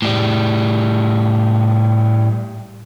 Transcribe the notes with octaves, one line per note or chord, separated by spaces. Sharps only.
A2 G3